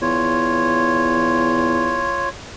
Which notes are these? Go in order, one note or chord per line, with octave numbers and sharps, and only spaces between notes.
E2 F4 C#5